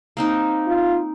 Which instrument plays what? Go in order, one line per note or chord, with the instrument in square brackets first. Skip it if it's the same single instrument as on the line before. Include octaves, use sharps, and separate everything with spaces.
[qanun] A#3 C4 D#4
[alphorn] F4